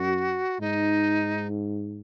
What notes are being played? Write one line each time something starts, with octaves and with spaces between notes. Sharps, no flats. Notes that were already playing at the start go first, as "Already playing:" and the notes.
Already playing: F#2 F#4
G#2 D#4